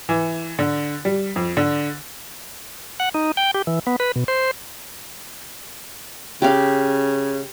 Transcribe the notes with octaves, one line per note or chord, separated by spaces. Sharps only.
E3
D3
G3
F2
D3
F#5
D#4
G5
G4
E3
B3
B4
B2
C5
C#3 G4 F5